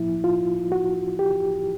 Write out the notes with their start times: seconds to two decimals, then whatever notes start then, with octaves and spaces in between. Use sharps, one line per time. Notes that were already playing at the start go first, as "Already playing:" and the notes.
Already playing: A2 F3 A#3 E4
0.24 F4
0.72 F#4
1.19 G4